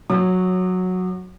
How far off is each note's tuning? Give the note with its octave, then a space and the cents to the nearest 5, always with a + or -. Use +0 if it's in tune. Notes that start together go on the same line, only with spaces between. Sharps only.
F#3 -10 C#5 +0 D6 +45